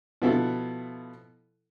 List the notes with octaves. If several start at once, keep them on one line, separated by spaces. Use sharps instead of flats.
B2 F3 B3 E4 A4